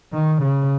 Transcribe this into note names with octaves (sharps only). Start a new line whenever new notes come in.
D#3
C#3